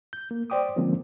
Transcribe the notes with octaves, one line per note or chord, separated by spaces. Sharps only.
G6
A#3
C5 D5 G5 D6 D#6
D3 F3 G#3 A#3 C4 C#4